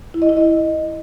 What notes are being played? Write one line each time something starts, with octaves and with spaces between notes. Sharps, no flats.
E4
D#5
E4
D#5